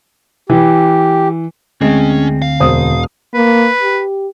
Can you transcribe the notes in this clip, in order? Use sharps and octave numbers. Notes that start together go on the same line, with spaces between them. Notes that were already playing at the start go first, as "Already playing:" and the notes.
E3 G4
D2 G#3 C4 C#4
F5
E1 C5 D#6
A#3 B4
G4